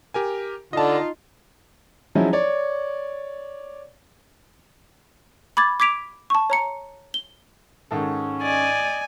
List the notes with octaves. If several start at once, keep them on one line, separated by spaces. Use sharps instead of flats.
G4 A#4 G#5
D3 D#4 F4 D#5 A5
F3 F#3 G#3 C#4 D#4 E4
C#5 D5
B5 D6 G#6 A6
D6 G#6 B6 D7 F7
A5 C#6
C#5 A#5 C#7
G7
G#2 D#3 C#4 A4
D5 D#5 G#5